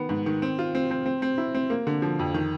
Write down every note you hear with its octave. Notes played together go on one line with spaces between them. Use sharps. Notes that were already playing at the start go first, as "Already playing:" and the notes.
Already playing: D#3 B3
G#2
D#3
C4
F4
C4
C4
C4
C4
E4
C4
A#3
D3
F3
F2
D#3